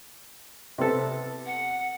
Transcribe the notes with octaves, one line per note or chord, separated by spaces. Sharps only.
C3 B3 A4
F#5